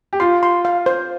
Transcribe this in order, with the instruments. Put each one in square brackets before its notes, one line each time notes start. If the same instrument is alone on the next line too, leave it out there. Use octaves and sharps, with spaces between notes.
[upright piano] G4
[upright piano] F4 [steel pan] C6
[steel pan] C6
F5
C5